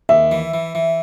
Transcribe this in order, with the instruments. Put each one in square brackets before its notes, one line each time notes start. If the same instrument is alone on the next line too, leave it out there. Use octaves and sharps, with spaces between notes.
[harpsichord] D#2 [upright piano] E5
[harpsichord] E3
E3
E3